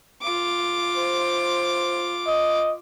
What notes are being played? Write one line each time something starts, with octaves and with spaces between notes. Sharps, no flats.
F4 D6
C5
D#5